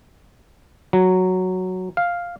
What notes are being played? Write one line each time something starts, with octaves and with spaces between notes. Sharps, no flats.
F#3
F5